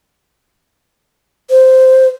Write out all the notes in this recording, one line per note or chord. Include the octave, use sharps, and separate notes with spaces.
C5